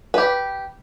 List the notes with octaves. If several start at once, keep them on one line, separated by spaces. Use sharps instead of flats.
G4 B4